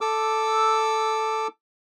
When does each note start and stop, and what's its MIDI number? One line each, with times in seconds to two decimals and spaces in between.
0.01 1.47 69
0.01 1.47 86
0.01 1.47 88